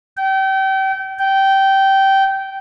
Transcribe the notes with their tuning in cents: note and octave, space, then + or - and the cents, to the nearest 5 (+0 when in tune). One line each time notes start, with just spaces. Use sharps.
G5 -30
G5 -15